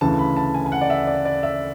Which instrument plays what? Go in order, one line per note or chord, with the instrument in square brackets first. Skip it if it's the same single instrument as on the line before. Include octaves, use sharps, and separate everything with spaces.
[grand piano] D2 C#3 E3 A5
B5
A5
G#5
G#5
F#5
D5
E5
D5
D5
E5